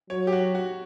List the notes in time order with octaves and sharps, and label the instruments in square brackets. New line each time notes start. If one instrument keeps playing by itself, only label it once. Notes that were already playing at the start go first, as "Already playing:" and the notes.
[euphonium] F#3 [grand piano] C#5
[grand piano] G4
F#4
F#4